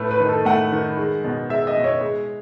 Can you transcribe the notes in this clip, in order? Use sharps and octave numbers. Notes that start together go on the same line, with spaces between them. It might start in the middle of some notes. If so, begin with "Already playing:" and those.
Already playing: A2 A3 B4
B4
D#3
A4
A3 F#5
D#3
G#3
B2
G#3 E5
D#5
B2
C#5
G#3